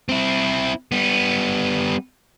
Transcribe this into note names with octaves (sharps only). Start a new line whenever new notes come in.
C4 E4
G3 B3